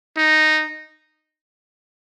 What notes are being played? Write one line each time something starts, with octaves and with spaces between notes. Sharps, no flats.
D#4